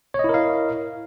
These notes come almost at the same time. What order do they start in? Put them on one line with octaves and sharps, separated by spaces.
C#5 D#5 E4 A#4 F5